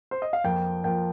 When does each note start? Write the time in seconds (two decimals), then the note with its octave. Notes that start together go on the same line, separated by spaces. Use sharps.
0.11 C5
0.22 D#5
0.33 F5
0.44 F2 F3 A#3 G5
0.84 F2 F3 A#3 G5